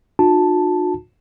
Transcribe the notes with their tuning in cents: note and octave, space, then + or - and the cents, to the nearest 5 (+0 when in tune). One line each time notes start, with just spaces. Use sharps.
D#4 -35 F#4 -45 A5 +0